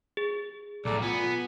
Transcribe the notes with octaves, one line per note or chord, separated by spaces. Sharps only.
G#4
B1 A2 A4 D5 A#5
B3 F4 G#5